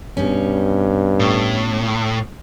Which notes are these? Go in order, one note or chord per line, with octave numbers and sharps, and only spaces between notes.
G2 B2 G3 C#4
A2